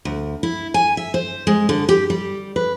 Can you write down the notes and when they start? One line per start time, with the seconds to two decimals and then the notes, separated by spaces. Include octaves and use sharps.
0.05 D2
0.43 E4
0.74 G#5
0.97 E5
1.14 C5
1.47 G#3
1.69 D3
1.89 G4
2.10 G3
2.56 B4